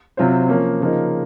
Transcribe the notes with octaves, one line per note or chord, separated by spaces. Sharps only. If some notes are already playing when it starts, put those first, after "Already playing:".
C3 F#3 C4 F4 C5
F3 A#3 C#4
C#3 F3 A#3 D#4